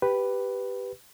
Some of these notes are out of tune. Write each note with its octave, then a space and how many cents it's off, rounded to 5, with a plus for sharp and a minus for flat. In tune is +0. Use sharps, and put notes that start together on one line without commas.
G4 +0 B4 +0